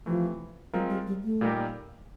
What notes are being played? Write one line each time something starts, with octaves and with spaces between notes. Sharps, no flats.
C3 E3 F3 A3
F#3 G#3 C4 F4 A#4
G3
G3
A3
A#2 G3 A#3 D#4 G4